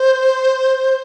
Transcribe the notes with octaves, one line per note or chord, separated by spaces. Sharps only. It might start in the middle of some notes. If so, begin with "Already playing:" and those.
Already playing: C5